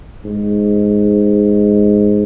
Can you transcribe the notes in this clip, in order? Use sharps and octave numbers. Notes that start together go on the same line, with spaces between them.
G#2